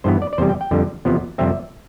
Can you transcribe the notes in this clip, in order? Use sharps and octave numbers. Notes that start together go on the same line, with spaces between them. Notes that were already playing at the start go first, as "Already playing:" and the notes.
G2 E3 B3 C5
D5
D5
E2 C3 G3 C5
G5
G5
F2 D3 G3
E2 C3 F3 B3
F2 C3 G3 C4 E5